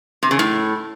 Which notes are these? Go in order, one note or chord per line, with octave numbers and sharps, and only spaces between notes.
C3
C#3
A2